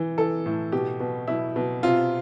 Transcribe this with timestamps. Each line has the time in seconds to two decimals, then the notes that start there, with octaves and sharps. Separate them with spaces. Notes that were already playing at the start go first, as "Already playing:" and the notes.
Already playing: E3
0.18 E3 A4
0.46 A2
0.72 B2 G4
1.00 B2
1.28 B2 E4
1.56 B2
1.83 C3 F4